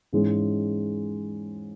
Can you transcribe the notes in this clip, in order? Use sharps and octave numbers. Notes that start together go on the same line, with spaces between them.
G#2 E3 G#3 C#4